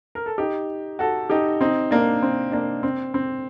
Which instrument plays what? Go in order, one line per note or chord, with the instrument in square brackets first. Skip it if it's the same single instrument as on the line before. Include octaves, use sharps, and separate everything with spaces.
[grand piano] A#4
A4
D#4 G4
F#4 A4
D#4 G4
C4 D#4
A#3 D4
C4
A#3 D4
C4
C4